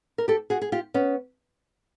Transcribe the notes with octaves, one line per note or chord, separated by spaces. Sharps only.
A#4
G4 A4
F#4 G#4
G#4
F4 G4
B3 C#4